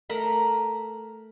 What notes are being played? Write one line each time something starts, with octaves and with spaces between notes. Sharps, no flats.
A3 A#4 A#5 B5